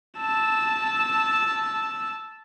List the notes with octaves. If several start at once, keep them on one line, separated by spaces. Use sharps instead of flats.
A5 E6